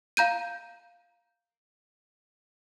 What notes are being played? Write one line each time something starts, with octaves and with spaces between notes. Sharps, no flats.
F5 A#5 G6 D#7